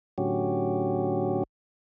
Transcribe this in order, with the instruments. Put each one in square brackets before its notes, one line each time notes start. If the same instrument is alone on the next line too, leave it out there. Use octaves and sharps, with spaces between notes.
[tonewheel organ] A2 D3 F#3 C#4 F#4 G4